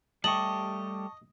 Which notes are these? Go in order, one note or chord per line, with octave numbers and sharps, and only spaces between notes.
G3 A3 G4 D#5 A5 C#6 F#7